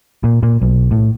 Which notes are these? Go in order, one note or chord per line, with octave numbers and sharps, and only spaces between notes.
A#2
A#2
B1
A2